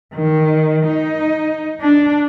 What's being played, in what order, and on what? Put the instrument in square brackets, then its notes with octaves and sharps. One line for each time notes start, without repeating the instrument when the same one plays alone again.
[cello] D#3
D#4
D4